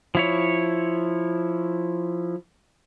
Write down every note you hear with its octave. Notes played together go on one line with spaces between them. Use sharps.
F3 E4 C#5